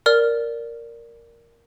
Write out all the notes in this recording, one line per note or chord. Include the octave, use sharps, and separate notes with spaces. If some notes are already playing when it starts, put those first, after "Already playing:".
A#4 D5 F6